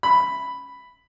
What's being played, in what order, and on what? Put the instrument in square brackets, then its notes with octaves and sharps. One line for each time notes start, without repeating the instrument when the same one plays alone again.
[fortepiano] B5